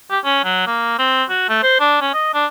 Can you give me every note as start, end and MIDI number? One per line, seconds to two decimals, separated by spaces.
0.11 0.19 67
0.24 0.40 61
0.44 0.66 54
0.67 0.95 58
0.99 1.24 60
1.29 1.47 66
1.49 1.62 57
1.63 1.77 72
1.80 2.01 62
2.01 2.13 61
2.14 2.32 75
2.34 2.46 62